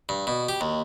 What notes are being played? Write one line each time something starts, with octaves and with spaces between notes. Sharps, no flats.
G2
B2
G4
D#2